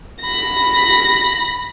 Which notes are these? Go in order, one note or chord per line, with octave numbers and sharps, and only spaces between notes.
B5 A#6